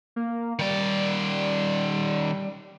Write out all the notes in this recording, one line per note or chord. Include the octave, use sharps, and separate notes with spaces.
A#3
D#3 G3 D5